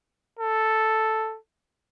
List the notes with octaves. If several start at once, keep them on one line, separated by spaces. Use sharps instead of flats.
A4